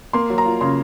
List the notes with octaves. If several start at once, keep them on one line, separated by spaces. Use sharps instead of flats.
A#3 C6
F#3
A#5
F4
C#3 C6